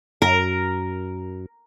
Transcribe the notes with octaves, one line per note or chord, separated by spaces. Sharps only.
F#2 A#4